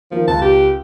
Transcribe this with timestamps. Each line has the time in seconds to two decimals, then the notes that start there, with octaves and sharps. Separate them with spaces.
0.11 D#3 F3 A#3
0.28 C#2 A5
0.42 G4